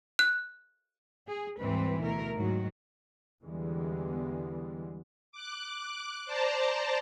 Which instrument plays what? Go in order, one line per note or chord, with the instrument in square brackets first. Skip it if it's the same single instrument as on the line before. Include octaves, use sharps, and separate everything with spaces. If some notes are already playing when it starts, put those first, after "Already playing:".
[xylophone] F#6
[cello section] G#4
D2 G#2 E3 G3 C4 B4
D2 B2 A3 E4 A#4
G#2 D#3 F#3 F#4
[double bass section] E2 D3 E3 G3 G#3 B3
[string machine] D6 F#6
C5 D5 A5 A#5